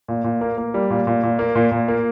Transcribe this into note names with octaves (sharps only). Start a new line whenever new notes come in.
A#2
A#2
A#3
A#3
G3
A#2
A#2
A#2
A#3
A#2
A#2
A#3